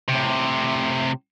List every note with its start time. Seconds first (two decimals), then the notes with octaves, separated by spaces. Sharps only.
0.08 A2 C3